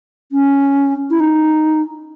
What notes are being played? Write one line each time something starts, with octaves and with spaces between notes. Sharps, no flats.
C#4
E4
D#4